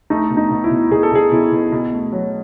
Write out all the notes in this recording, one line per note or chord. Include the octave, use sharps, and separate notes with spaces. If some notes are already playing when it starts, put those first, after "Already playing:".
A3 D#4
B2
D#4
B2
E4
B2
B2 G#4
A4
B2 G#4
B2 E4
B2
B2
A3
F#3